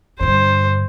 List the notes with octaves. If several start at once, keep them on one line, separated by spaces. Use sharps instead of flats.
G2 D3 C5